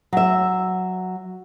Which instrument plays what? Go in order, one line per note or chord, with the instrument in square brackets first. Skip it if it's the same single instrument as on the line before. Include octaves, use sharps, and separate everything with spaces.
[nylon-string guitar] F#3 E5